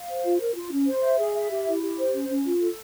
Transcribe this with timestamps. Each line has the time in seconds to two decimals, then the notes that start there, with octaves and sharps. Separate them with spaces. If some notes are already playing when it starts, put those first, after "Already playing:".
Already playing: F5
0.09 C5
0.24 F4
0.40 A#4
0.56 F4
0.72 C#4
0.87 C5
1.03 E5
1.19 G#4
1.35 E5
1.50 G4
1.66 E4
1.82 G4
1.98 C5
2.13 C#4
2.29 C#4
2.45 F4
2.61 A4